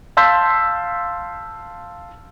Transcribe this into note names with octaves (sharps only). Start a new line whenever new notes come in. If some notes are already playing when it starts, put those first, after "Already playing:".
F5 A5 C6 E6 G6 B6